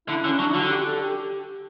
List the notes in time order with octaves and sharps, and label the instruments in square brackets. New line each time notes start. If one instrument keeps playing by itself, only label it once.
[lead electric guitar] D3 [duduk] E4
[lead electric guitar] D3 [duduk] C#4
[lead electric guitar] F#3 [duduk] D4
[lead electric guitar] D3 [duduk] F#4
[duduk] G4
A4
G4